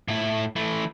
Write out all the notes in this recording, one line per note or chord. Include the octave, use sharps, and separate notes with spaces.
A2 E4
E3 A3